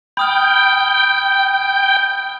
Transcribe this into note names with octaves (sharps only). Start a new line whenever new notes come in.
G5 B5 D#6 F6